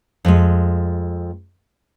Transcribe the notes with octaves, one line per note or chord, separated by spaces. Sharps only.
F2 G#3